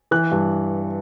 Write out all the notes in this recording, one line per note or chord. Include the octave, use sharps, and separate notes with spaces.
E3 F#6
G2